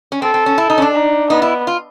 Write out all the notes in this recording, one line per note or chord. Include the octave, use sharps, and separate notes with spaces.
C#4
C4 A4
C4
C#4
E4
D#4
C#4
D4
D#4
B3 D#4
E4
F4